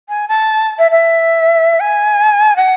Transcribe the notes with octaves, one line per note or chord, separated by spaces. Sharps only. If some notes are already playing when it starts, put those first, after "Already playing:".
G#5
A5
E5
E5
G#5
F#5